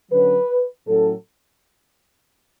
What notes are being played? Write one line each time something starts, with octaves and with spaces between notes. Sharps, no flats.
D3 F#3 C#4 B4
A2 F#3 C#4 A4